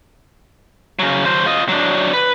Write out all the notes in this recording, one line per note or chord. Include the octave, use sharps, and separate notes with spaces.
C#3 F#3
F#3 C5
F4 D#5
F#3 D4
B4